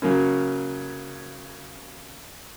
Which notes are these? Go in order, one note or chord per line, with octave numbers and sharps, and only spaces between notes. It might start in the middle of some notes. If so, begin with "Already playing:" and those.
C#3 F#3 A#3 C#4